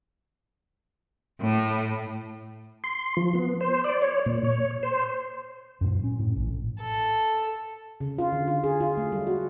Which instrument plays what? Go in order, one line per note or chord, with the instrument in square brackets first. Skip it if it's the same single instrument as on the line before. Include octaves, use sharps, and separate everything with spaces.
[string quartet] A2
[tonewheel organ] C6
F3
B3
C5
D5
C#5
A#2
C#5
C5
[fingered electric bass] F#2 A#2
C#4
A2
A#1 A2
[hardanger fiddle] A4
[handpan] C#3
F4
D3
F4
G#4
F4
A3
G3
F#4